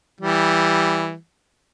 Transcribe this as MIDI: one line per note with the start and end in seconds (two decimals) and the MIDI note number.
0.21 1.14 52
0.21 1.14 55